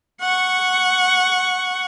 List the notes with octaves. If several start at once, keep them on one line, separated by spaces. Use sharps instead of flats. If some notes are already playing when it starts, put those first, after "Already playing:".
F#5 C#6